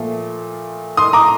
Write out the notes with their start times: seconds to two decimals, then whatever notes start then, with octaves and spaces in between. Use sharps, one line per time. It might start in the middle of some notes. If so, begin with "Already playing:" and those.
Already playing: A#2 F3 A3
0.97 C6 D#6
1.13 A#5 D6